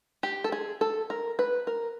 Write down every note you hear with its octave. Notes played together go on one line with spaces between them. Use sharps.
G4
A4
G#4
A4
A#4
B4
A#4